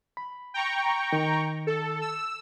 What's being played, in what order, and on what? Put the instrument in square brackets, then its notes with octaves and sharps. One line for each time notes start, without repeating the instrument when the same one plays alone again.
[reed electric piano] B5
[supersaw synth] G5 A#5 C#6
[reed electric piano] D#3
[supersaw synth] A4
E6